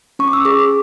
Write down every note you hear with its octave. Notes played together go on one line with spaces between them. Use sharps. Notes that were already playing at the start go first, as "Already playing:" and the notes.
C#4 C#6
D6
E6
G#4 D6
D6